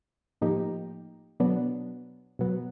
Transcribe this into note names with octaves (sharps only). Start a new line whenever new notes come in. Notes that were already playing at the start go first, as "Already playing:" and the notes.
A2 F3 A#3 D#4 G4
B2 F#3 B3 D4
B2 F#3 B3